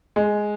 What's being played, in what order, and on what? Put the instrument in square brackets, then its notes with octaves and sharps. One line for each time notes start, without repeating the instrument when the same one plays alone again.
[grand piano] G#3